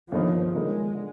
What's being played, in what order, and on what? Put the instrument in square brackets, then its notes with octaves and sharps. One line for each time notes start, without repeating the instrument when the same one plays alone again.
[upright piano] G1 G2 D#3 A#3 D#4 [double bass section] F3
[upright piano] G1 G2 D#3 A#3 D#4 [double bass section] G#3
[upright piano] D3